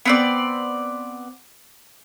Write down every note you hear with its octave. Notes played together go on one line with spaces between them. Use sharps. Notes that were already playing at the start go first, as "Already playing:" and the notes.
B3 C4 D5